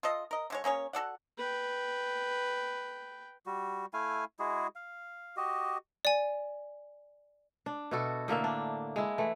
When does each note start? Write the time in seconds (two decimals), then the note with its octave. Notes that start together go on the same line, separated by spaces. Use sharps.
0.03 F4 A4 D#5
0.31 A#4 D#5
0.50 D3 G#3 C#5
0.64 A#3 C#4 G#4 C#5
0.93 F#4 A4 D5 F#5
1.37 B4 G5
3.46 G3 F#4
3.93 A3 E4 F5 G#5
4.39 G#3 E4 F#4 G#4
4.76 F5
5.37 F#4 G4 D#5
6.05 D5 G#5
7.66 D4
7.91 B2 E4 F#4 A4
8.28 A2 D3 A#3 E5
8.44 D4
8.96 G#3 E4
9.18 E3 A3